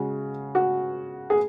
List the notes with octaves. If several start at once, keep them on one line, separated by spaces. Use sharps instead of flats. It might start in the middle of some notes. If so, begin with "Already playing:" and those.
Already playing: C#3 G#3 F#4
F#4
G#4